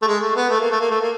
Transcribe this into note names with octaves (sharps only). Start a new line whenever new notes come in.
A3
G#3
A3
B3
A3
A#3
A3
A#3
A3
A#3